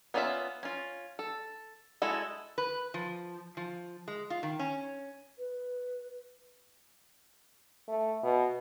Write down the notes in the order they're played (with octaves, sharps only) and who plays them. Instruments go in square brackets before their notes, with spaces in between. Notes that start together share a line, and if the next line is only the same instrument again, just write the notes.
[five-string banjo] B3 C#4 D4 F4 E5
C#4 F4
A4
G#3 E4 F#4 A4
[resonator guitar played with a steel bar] B4
F3
F3
G#3
F4
D#3
C#4
[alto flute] B4
[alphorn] A3
B2